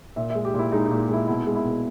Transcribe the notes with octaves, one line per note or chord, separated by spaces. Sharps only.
A#2 E5
E5
G#3
G4
A#2 E4
G#3 D#4
A#2 D#4
G#3 E4
B2 E4
G#3
E4
B2